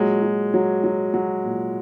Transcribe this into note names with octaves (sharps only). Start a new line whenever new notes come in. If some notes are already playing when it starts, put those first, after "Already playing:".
Already playing: A#2 F#3 G#3
F#3
F#3
F#3
F#3
A#2